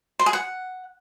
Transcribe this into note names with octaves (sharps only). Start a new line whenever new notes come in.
C5
G#4
F#5